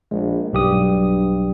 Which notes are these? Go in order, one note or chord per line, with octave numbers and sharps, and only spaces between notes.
A#1 G#3
B1 G2 G4 D#6